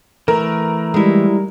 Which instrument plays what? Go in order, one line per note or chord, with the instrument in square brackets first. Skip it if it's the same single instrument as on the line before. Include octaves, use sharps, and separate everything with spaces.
[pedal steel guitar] E3 A3 [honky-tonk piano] A#4
[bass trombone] G3 [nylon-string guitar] G#3 E4